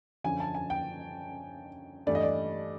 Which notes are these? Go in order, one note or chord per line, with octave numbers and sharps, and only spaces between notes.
F#2 D3 F3 G#5
A5
G#5
G5
G2 E3 A3 D5
D#5
D5